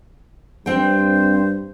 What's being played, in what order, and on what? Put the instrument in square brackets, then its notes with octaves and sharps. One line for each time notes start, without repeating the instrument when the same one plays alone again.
[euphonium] G2 [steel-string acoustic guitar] C4 G5 [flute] C5